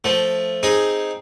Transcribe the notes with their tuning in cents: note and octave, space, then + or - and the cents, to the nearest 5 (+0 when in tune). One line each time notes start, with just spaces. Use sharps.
F3 +0 A3 +0
C4 +0 D#4 +0 G#4 +0